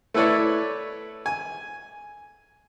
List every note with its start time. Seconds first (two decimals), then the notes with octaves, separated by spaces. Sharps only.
0.14 A3 E4 A4 B4 C#5 D5
1.26 G#5